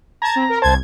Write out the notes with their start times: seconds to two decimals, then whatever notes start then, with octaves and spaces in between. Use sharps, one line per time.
0.22 A5 A#5 G#6
0.35 C4
0.49 A#4
0.62 C2 C5 A5 G#6